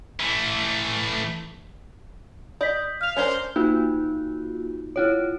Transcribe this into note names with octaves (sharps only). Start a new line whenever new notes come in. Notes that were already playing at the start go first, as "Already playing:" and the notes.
E3 A3
D5 D#5 G6 B6
F5 F6 F7
C#4 D4 A#4 C5
A#3 D#4 F4 F#4
E4 F4 C#5